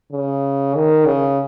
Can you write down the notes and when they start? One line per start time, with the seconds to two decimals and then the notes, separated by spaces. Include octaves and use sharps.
0.12 C#3
0.75 D#3
1.06 C#3